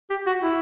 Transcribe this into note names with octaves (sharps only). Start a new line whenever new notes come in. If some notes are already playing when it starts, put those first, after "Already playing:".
G4
F#4
E4